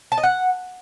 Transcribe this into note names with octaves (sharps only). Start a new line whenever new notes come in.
A5
D#5
F#5